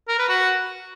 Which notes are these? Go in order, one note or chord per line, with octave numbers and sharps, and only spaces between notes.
A#4
B4
F#4